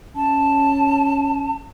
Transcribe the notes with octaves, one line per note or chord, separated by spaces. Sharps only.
C#4 A5